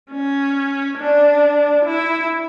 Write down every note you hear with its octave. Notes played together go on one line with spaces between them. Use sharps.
C#4
D4
E4